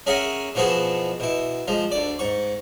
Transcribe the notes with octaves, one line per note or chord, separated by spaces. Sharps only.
C#4 G#4 A#4 E5 F#5 G#5
B2 E3 F3 E4 F#4 G#4
B2 E4
F3 G#3
D2 D5
G#2 C#6